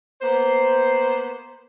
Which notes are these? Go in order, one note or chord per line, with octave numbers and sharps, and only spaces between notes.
A#3 B3 C5